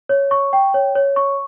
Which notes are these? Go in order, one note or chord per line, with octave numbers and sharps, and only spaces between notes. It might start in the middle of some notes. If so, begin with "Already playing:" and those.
C#5
C#6
G5
C#5
C#5
C#6